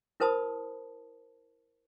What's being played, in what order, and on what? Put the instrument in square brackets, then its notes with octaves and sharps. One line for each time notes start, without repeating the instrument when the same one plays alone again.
[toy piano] E4 A#4 C5 A5 B5 D#6